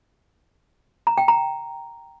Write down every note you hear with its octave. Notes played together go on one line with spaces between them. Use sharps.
A#5
G5
A#5